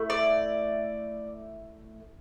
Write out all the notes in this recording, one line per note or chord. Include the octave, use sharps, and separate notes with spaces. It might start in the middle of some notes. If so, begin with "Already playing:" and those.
Already playing: A3 E4
D5